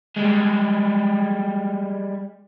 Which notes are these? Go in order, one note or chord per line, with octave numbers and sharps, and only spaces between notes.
G3 G#3